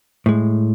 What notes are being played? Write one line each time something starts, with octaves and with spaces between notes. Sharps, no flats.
A2 G#3